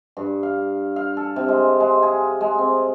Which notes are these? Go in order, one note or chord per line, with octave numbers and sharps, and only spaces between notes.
G2
F5
F5
A4
C3
G#3
G#3
G#4
G#3
C4